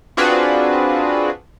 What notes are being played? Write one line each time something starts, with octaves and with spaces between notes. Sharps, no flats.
C4 D4 F4 F#4 G#4 B4